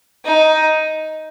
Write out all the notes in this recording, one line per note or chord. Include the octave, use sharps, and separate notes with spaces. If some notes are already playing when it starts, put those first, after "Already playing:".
D#4